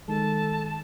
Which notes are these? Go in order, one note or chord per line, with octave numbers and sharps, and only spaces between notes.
D#3 G#3 A4 A5